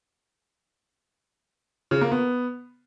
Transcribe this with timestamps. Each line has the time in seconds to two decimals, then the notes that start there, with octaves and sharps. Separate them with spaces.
1.91 C#3
2.01 A#3
2.12 B3